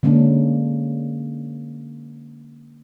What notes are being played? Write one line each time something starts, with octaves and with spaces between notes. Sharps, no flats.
D3 G#3 A#3 C#4 D4